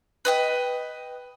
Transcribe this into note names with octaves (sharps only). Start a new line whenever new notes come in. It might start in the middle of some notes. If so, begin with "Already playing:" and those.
B4 D#5 G5